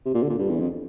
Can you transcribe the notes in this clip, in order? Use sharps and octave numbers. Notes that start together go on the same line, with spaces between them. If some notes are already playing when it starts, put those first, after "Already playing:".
C3
A#2
D3
A#2
G2
E2
F2